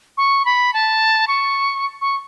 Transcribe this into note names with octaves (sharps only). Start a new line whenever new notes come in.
C#6
B5
A5
C#6
C#6